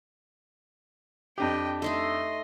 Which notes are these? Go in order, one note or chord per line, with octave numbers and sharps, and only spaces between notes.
F2 D4 G4 D#5 G5
A3 D#4 A4 D#5 C6